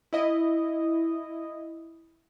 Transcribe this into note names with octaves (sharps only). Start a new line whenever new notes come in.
E4 D#5